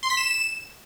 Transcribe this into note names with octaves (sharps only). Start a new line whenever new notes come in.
C6
B6
E7